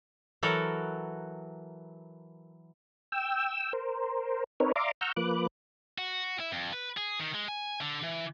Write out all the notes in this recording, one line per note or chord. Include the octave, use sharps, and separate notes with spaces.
E3 F#3 F#4 A4 A#4
G5 E6
A#4 C5
C4 D#4 A#4 B4 C#5
D5 E5 F5 A#5 C6 D6
F#5 A#5 C#6 E6 F6 G6
F3 A#3 B4 D6 F#6
F#4
E4
F2
B4
G#4
D#3
G#3
G#5
D3
E3